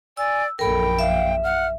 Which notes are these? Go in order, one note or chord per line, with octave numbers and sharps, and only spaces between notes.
D5 G#5 E6
A#1 F#2 A4 A#4 G5 B5
E5 F5
F#5 F6